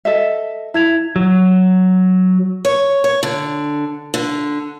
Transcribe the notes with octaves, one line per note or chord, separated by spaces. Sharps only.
A4 D#5 E5
E4 E5 G#6 F7
F#3
C#5
C#5
D3
D3